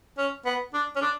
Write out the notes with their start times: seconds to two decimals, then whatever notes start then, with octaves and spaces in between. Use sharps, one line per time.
0.18 C#4
0.45 B3
0.74 D4
0.96 C#4
1.01 D4